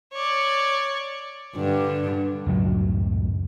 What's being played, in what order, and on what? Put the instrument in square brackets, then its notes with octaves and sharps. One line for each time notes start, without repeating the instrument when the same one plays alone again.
[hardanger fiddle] C#5 D5
[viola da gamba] G2 [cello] D3
[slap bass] C#2 F#2 A2 F#3